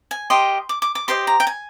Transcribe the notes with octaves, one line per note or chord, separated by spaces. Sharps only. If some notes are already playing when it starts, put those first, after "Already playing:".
G#5
G4 A#4 D#5 C6
D6
D6
D6
G4 C5 D#5 C6
A#5
G5
G#5